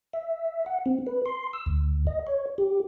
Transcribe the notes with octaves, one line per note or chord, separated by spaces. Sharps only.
E5
F#5
C4
B4
C6
E6
D2
D#5
C#5
G4